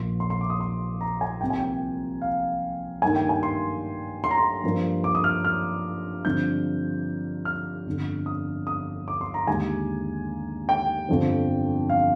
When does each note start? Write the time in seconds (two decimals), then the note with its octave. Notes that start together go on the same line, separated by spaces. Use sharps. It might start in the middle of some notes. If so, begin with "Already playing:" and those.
Already playing: A#1 A#2 F3 A#3 C6
0.20 C6
0.30 C6
0.41 D6
0.50 D#6
0.61 C6
1.01 A#5
1.21 G#5
1.41 C2 C3 F3 A#3 G5
1.50 G#5
1.59 G5
2.22 F5
3.02 G2 D#3 A#3 G#5
3.16 G5
3.29 G#5
3.43 C6
4.24 C6
4.31 A#5
4.38 C6
4.64 G2 F3 A#3
5.04 D6
5.15 D#6
5.24 F6
5.45 F6
6.25 G2 D3 F3 C4 G6
7.45 F6
7.86 G1 F2 D3
8.26 D#6
8.67 D#6
9.08 D6
9.21 C6
9.34 A#5
9.47 D#2 D3 G#3 G#5
10.69 G5
11.09 G1 F2 D3 F3 C4
11.90 F5